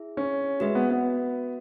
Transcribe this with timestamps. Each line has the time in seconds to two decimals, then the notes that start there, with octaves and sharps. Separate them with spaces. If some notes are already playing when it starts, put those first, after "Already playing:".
Already playing: E4 G#4 E5
0.17 C#4
0.60 G#3 F#4 B4 E5
0.75 B3
0.90 B3